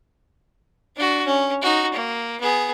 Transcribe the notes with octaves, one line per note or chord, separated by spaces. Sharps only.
D4 F#4
C#4
D#4 F#4
A#3
B3 G#4